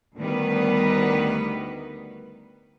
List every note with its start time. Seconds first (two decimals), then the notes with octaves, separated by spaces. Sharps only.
0.17 D2 D#3 G3 B3 B4